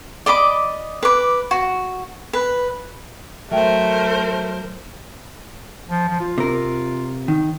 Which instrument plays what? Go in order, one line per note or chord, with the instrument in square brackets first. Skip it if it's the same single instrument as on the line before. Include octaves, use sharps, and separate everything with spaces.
[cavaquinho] D5 D#5 B5 D6
B4 D6
F#4
B4
[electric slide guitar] F#3 [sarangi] A3 [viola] A#4 C5 [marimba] E5 G5
[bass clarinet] F3
F3
F4
[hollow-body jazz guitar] C3 A#4
D#3